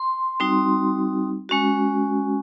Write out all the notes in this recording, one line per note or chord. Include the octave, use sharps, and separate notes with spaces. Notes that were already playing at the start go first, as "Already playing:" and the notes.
Already playing: C6
G3 C4 D#4 F#4
G#3 C#4 F#4